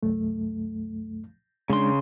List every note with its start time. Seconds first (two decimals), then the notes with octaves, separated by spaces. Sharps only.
0.03 C2 F#2 A3
1.70 C#3 G#3 D4 C6